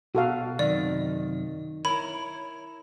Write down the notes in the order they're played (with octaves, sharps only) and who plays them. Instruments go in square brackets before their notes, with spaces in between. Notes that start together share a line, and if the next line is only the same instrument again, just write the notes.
[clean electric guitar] B2 [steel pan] F#4 A4 F5
[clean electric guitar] F#2 C3 [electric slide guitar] D#3 [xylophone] D5
[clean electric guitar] E4 A#4 [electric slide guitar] C#5 [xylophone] B5